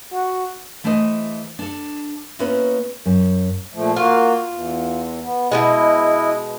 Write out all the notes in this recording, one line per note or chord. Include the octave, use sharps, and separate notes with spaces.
F#4
E3 A3 G#4 C5 D5 D#5
D4 A4
A#3 B3 C#4 E4 B4 C#5
F#2
A#2 F3 A3
A#3 F4 F#4
E2
B3
B2 F3 G#3 E4 D#5